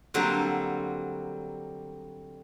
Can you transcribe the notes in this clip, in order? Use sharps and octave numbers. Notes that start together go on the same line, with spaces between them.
D3 F#3 G3 A#3 C4 D4